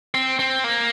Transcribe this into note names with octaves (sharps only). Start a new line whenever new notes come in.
C4
C4
A#3